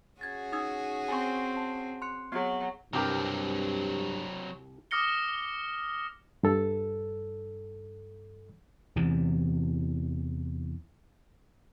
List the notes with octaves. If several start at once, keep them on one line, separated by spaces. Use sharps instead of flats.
C#4 F#4 G#4 G#6 A6
D#4 D#6 G#6
C4 G#5 C#6
A5
C6 F#6 C#7
F#3 B3 G#4
C2 G2 F#3 C4 G4 A#4
D6 D#6 F6 A#6 C#7 G7
G2 A4
E2 C3 E3